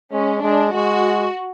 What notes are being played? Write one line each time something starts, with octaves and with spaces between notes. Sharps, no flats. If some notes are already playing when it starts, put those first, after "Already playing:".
G#3 C#4
G#3 D4
G#3 F#4